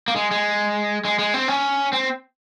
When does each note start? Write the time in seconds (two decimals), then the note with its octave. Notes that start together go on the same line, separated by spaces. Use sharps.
0.08 A#3
0.16 G#3
0.31 G#3
1.05 G#3
1.19 G#3
1.34 C4
1.48 C#4
1.93 C4